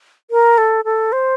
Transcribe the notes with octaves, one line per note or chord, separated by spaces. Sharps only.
A#4
A4
A4
C5